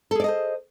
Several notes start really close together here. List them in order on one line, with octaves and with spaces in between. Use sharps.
A4 G#4 D5 D#5 C5